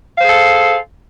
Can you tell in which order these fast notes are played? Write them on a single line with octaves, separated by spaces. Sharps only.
F5 C5 G#4 A4